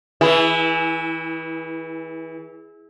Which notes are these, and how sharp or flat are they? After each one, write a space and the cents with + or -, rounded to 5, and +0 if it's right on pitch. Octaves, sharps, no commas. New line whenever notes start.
E3 -25 E4 +0 G#4 +0